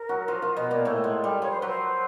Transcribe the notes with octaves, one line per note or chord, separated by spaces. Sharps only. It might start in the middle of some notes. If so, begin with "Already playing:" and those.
Already playing: A#4
F#3 F#4
F3 F4
F3 F4
B2 B3
A#2 A#3
A2 A3 A4
G#3
G3
F3 C#5
C5
F#3 B4
C5